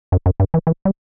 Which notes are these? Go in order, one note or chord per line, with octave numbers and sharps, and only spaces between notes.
F#2
F#2
G2
E3
E3
G3